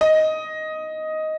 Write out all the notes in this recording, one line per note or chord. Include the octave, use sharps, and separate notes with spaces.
D#5